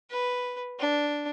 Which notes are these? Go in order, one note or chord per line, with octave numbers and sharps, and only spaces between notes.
B4
D4